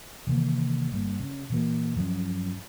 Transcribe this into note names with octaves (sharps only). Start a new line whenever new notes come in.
C3 D#3 E3 A#3
G1 G2 G3 A#3
C#3
A#2 E3 A#3
G2 F3 F#3 C#4